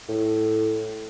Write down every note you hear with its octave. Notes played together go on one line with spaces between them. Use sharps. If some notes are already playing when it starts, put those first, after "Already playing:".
A2